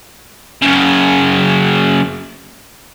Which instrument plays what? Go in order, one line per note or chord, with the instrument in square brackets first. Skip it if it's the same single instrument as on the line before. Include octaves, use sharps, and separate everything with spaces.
[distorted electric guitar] F#2 C#3